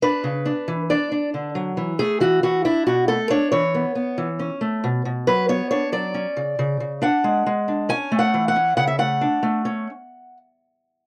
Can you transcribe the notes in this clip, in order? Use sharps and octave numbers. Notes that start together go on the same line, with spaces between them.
D4 B4
C#3
D4
E3
D4 D5
D4
D3
F#3
E3
A3 G#4
E3 F#4
E3 F#4
D4 E4
B2 F#4
A3 A4
D4 C#5
E3 C#5
B3
B3
E3
C#4
A3
B2
B2
F#3 B4
B3 C#5
D4 C#5
F#3 D5
C#4
C#3
C#3
C#3
D4 F#5
G#3
G#3
D4
C#4 G#5
A3
F#5
E3
F#5
C#4
C#3 F#5
E5
A3 F#5
D4
A3
C#4